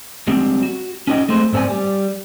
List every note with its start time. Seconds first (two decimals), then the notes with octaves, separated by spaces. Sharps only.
0.27 G3 G#3 C4 D4
0.63 F#4
1.07 C#4 D#4 F#4 C5 D#5 G5
1.29 G#3 A3 C4 C5
1.53 G#2 C4 A4 D5 G#5
1.69 G3